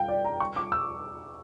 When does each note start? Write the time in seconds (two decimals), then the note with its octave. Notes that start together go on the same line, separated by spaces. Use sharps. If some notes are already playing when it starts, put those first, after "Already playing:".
Already playing: F5 G5
0.08 D5
0.25 A#5
0.40 C#6
0.56 D6
0.72 E6